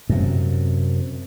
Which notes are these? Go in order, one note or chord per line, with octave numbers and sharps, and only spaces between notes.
F#2 C3